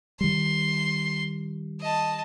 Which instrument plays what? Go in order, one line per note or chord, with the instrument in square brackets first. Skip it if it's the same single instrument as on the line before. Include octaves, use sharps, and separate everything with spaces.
[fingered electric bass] D#3 G3 [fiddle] C6
[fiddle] D#5 A5